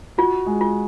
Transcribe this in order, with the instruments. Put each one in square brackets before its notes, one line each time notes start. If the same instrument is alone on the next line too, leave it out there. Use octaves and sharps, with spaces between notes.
[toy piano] F4 [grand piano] F#4
[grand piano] G#3
[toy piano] F4